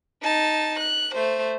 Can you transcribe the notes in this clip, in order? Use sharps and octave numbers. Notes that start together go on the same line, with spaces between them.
D#4 A5
F#6
A3 C5